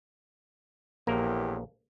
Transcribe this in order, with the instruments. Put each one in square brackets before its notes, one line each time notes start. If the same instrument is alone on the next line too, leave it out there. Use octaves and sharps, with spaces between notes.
[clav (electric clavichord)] A#1 A#3 A#4 [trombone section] E2 A2 G4